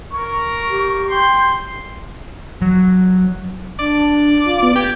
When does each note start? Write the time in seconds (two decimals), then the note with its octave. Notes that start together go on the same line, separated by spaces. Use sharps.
0.11 A#4 C#6
0.70 G4
1.10 G5 C6
2.62 F#3
3.79 D4 D5
4.46 F4
4.63 B3
4.76 G4 G#6